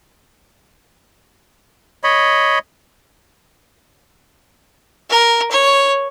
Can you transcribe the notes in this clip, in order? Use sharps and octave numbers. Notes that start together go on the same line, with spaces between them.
C#5 D#5 B5
A#4
C#5